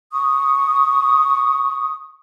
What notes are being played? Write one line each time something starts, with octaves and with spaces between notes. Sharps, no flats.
C#6 D#6